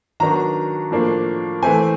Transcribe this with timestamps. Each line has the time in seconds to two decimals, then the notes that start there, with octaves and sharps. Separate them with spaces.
0.20 D#3 F#3 B3 D4 A#5
0.91 A2 F3 A#3 D4
1.62 E3 A3 C4 G#5